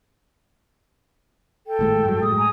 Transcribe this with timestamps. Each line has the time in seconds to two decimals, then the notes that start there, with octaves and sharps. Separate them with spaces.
1.67 A4 G5
1.79 G#1 A2 G#3
2.05 G2 F#3
2.22 A2 G#3 D#6
2.38 G#5 A#5